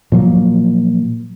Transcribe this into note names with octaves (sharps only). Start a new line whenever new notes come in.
A#2 F3 F#3 A#3